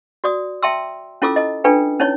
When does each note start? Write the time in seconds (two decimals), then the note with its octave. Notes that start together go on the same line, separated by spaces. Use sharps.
0.24 F#4 D5 D#6
0.63 E5 G5 A5 C6 E6
1.22 C#4 E4 F4 A4 D6 E6
1.36 E4 A4 D#5
1.64 D4 F4 A4 B4 G5
1.99 C#4 D#4 E4 C#5